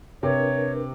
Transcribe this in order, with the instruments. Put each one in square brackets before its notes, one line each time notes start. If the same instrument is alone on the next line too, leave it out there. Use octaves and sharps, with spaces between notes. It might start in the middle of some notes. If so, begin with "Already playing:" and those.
[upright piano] C3 [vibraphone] D4 A#4 B4 [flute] C#5